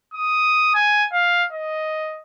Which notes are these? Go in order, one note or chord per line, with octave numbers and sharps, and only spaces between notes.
D#6
G#5
F5
D#5